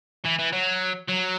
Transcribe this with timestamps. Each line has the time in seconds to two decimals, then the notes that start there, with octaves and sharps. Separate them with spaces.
0.25 E3
0.39 E3
0.53 F#3
1.09 F#3